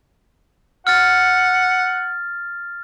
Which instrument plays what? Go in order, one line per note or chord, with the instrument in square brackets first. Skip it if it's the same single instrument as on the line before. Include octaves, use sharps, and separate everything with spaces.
[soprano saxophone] F#5 [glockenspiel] F6 A6